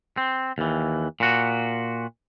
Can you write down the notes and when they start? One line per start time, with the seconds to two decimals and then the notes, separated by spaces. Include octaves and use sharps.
0.17 C4
0.58 D#2 E3
1.20 A#2 F#4